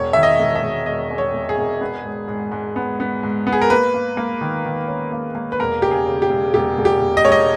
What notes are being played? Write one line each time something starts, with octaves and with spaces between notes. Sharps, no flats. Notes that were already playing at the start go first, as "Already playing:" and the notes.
Already playing: E1 C#5
D#3 E5
D#5
E1
E5
E1
E1 D#5
E2
C#5
E1
G#4
E1
B3
G#2
G#2
G#2
B3
B3
G#2
B3
G#4
A#4
A#3 B4
A#3
A#3
D#3
D#3
C#4
A#3
A#3
B4
E1 A#4
C#3 G4
G#4
C#3
G4
E1
E1 G4
E1
G4
E1
D#5
E1 C#5
D#5